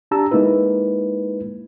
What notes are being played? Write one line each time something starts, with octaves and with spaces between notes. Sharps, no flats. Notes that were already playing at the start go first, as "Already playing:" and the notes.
D4 G4 A5 A#5 E6
G#3 A#3 D#4 E4 B4